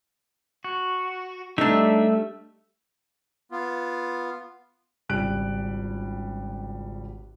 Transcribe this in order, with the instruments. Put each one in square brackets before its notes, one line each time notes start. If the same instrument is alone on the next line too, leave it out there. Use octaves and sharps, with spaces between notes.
[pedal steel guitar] F#4
[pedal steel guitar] G3 A3 E5 [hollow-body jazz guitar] D4 D#4
[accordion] B3 F4
[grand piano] G#1 C#2 G3 F#6 D7